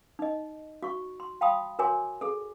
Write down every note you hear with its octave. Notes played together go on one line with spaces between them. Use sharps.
D#4 D#5
F#4 C#6
C6
F5 G5 A5 B5 C6 D#6
F#4 A#4 C#5 G#5 C6 D6
G#4 A4